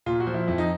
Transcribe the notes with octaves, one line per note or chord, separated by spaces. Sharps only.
A#2 F4
F#4
F3
E4
F2 E4
D#4